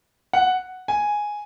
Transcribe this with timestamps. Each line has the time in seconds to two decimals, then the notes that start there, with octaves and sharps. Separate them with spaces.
0.33 F#5
0.88 G#5